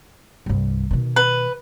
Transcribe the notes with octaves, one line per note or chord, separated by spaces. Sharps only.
C2 G2
B2 D#3
B4